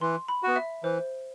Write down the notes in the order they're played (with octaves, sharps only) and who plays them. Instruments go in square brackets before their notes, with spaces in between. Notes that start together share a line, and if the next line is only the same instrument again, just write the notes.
[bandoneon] E3 [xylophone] C6
[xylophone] B5
[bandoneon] B3 F#4
[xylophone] E5
[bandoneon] E3 [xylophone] C5